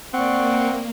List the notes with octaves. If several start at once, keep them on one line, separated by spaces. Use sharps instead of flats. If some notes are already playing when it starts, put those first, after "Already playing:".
A#3 C4 D5 F#5 C#6